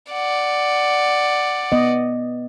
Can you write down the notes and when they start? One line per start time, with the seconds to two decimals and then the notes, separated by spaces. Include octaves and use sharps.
0.12 D5 F#5
1.72 B3 D#5